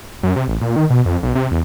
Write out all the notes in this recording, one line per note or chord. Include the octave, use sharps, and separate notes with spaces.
F#2
C3
A1
A#2
D#3
B2
F2
B1
C3
E2